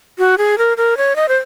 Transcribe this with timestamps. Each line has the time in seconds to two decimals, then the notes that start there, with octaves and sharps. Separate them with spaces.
0.19 F#4
0.38 G#4
0.58 A#4
0.77 A#4
0.97 C#5
1.16 D#5
1.28 C5